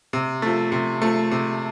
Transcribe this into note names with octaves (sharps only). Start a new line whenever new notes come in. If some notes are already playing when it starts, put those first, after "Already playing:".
C3
F3 A3
C3
F3 A3
C3